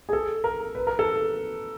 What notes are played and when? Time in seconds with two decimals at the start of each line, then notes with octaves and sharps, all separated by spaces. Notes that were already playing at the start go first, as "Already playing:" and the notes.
0.09 G#4
0.13 A4
0.44 A#4
0.75 B4
0.87 A#4
0.99 A4